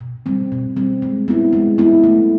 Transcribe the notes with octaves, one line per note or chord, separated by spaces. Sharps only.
B2
G3 C4
B2
G3 C4
G#3
B3 E4
G#3
B3 E4
A3